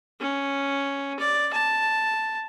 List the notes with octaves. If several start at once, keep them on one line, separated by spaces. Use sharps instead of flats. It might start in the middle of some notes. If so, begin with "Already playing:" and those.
C#4
D5
A5